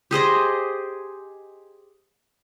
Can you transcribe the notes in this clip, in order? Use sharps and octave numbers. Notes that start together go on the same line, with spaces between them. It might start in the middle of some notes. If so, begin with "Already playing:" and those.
G4 G#4 C5 D#5